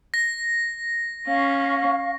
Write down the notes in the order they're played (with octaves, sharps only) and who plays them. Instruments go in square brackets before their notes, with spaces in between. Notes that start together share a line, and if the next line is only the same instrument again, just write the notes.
[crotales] A#6
[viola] C#4 [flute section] F5 C#6